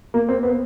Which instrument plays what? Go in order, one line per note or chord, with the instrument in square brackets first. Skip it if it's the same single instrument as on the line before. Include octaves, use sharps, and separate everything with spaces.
[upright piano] A#3
C4
B3